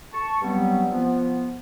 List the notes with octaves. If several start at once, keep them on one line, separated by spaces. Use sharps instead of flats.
A5 C#6
G2 F#3 G3 B3 C4
F3 B3